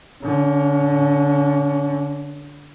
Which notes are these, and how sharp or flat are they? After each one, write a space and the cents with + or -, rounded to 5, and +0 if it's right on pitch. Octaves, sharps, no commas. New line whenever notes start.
D3 -15 C#4 +20